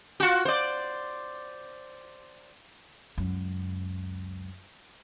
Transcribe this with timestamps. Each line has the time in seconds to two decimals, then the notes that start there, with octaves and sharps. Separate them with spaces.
0.20 F4 F#4
0.45 C5 D5
3.18 C#2 F#2